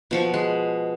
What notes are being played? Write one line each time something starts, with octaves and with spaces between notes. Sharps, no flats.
B2 F3 C#6
G#3